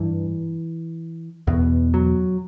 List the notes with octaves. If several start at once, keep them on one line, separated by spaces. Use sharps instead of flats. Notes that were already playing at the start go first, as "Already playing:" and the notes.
Already playing: G2 E3
E2 B2
F#3